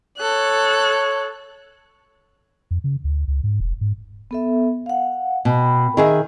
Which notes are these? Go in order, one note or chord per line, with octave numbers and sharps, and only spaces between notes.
A4 C#5 F#6
F2
C#3
D2
C#2
G#2
E1
G#2
B3 A4 E5
F5 F#5
B2 G5 B5
D#3 G#4 E5